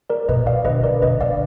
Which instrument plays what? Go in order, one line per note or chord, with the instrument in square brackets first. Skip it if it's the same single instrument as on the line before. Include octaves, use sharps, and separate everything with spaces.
[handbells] A#4 D5
[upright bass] B2 [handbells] B4 D#5
[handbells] D5 F5
[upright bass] D3 [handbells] B4 D#5
[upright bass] D3 [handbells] A#4 D5
[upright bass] B2 [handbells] B4 D#5
[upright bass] D3 [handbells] D5 F5